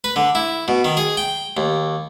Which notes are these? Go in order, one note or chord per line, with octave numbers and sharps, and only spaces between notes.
B4
D3
E4
B2
D#3
G#4
G5
D#2